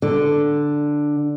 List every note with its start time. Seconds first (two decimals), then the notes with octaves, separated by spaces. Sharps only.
0.02 D3